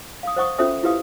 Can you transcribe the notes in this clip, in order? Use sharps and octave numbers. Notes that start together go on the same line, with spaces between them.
F5 D#6
C5 D#5 F#5 C#6 D#6
C#4 F4 A4 C5 E5 D#6
E4 F4 G4 B4 F5 D#6